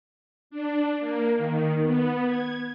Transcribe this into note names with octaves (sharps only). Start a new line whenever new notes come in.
D4
A#3
D#3
B3
G#6